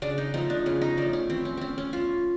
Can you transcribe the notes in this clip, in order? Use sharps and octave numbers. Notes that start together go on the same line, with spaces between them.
C#3 D4
D#4
F3 A3 D#4
D4
C#3 C#4
D#4
F3 A3 D4
C#4
E3 C4
C#4
A3 C4 C#4
C#4
E3 F4